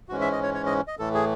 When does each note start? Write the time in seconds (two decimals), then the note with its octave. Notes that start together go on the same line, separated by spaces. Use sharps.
0.09 G#2 E3 G#3 C#4 F#4
0.21 E5
0.32 D#5
0.43 C#5
0.54 C#5
0.66 D#5
0.88 D#5
0.99 A2 E3 A3 A4
1.14 G#4